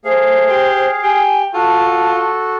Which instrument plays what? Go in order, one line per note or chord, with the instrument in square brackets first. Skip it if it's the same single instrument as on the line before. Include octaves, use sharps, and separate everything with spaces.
[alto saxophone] A3 [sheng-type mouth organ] G#4 F5 [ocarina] C5
[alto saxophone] G4
[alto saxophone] G4 [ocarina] G#5
[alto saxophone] F4 [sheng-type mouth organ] F#4 A4 [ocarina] A5